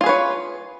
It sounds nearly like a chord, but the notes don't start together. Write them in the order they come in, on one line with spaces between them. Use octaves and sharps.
F4 G#4 B4 C#5